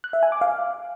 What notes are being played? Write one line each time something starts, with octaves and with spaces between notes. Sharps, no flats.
F#6
E5
G#5
D6
F5